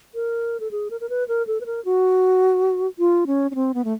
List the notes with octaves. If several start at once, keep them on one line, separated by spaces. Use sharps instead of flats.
A#4
A4
G#4
A#4
A#4
B4
A#4
A4
B4
A#4
F#4
F4
C#4
C#4
C4
B3
A3